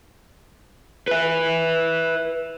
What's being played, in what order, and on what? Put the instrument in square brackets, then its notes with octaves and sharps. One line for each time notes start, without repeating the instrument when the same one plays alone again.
[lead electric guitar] B4 E5